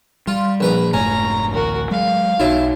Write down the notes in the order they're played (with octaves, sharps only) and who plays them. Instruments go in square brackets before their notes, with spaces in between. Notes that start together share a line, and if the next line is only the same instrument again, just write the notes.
[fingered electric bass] G3 [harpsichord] F4
[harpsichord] A#1 B4 A#5
[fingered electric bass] F1 G#2 A3 [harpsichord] C#4 [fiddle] A#5
[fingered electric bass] A1 D2 [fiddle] F#4 A#4
[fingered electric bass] F#3 G#3 [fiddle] F5
[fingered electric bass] B1 [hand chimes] D#4 F#4 C#5 [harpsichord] E4